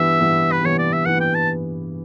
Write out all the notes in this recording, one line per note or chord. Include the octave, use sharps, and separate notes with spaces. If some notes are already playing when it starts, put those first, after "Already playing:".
Already playing: G2 E3 B3 E5
G2 E3 B3
B4
G2 E3 B3 C#5
D5
E5
G2 E3 B3 F#5
G5
A5